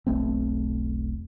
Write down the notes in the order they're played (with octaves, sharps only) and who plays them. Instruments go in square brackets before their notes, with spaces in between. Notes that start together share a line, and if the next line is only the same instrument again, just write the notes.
[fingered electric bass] E1 B1 A3 C4